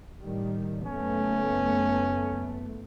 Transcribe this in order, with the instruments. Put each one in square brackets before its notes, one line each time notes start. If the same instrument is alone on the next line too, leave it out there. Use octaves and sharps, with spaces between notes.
[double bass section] A2 D#3 G3
[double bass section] F#1 A3 B3 [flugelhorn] C#4